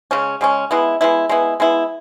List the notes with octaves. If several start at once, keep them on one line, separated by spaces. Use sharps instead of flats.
C#3 G#3 C#4
C#3 G#3 C#4
G#3 B3 E4
G#3 B3 E4
G#3 B3 E4
G#3 B3 E4